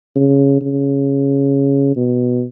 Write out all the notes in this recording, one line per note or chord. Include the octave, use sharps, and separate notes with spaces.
C#3
C#3
B2